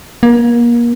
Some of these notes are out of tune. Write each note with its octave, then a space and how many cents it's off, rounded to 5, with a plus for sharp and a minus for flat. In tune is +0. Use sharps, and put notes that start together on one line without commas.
A#3 +30